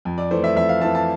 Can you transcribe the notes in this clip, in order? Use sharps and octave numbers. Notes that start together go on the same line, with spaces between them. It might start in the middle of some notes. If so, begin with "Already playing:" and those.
F2
D5
E3 A3 C5
E5
F2 E5
F5
E3 A3 A5
A5